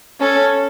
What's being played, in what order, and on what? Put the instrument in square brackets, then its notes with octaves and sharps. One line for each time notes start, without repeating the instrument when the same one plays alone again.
[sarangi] C#4 [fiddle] A4